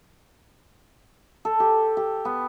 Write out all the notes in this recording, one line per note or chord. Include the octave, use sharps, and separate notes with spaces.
A4
G4
G4
B3